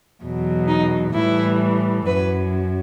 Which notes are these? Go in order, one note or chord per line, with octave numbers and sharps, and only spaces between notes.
E2 B2 F#3
D#4
A2 E3 G3 E4
F#2 F#3 B4